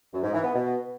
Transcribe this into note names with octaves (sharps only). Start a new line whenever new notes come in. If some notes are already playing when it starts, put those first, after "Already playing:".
F#2
G#2
E3
B3
B2